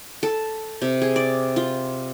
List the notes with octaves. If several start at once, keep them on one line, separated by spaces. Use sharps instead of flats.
A4
C3
G#4
D5
F4